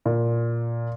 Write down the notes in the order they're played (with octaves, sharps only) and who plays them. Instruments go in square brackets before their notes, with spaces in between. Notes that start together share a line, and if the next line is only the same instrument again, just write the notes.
[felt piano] A#2